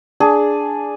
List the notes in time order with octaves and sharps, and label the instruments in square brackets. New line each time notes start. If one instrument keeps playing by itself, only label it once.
[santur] D4 G#4